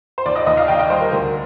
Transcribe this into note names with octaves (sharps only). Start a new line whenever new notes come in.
C5
D#2 D5
D#5
D#2 D#5
F5
D#2 G5
D#5
G3 C5
A#4
D2 A#4